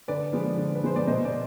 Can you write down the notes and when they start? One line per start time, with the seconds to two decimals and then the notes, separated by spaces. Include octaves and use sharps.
0.08 D3 B4 D5
0.33 F3 G#3 B3
0.58 D3
0.75 B4
0.83 F3 G#3 B3 C5
0.96 D5
1.07 B2 C5 D#5
1.25 D5